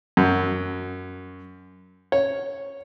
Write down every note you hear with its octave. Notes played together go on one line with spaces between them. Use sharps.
F#2
C#5